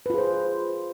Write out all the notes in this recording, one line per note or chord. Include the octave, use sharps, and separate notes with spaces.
F4 G#4 B4 C5